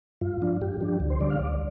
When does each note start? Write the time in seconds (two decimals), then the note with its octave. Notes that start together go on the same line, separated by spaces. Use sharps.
0.21 G2 F4
0.42 F3 D4
0.61 G2 G4
0.81 F3 D4 G4
1.00 D2
1.10 C5
1.20 D3 G3 D5
1.30 F5
1.39 D2 D5